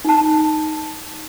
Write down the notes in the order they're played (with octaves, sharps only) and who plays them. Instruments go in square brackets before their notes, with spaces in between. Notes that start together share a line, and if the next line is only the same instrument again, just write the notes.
[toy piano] D#4 A5